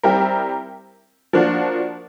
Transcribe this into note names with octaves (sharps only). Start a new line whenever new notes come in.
G3 C4 E4 G4 A#4
F3 A#3 D4 F#4